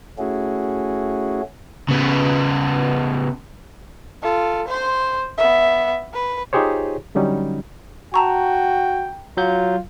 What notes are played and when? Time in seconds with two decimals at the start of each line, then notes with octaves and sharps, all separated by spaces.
0.18 A3 C#4 E4 F#4 G#4
1.89 C#3 B3
4.23 F4 A4
4.68 C5 C6
5.38 B3 E5
6.13 B4
6.53 D#4 F4 G4 G#4 C5 C#5
7.15 D3 F#3 G3 C#4 D#4
8.14 F#4 G5 A5 A#5 C#6
9.37 F#3 F4 G6